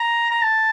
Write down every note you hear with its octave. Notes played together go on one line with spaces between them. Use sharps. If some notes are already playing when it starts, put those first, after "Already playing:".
Already playing: A#5
A#5
A5